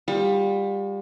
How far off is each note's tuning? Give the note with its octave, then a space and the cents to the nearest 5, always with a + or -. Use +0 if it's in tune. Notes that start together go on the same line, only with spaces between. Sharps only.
G3 +20 F4 +40